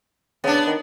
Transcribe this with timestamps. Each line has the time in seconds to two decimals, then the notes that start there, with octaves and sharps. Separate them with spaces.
0.44 C#3 B3 D4
0.67 D#3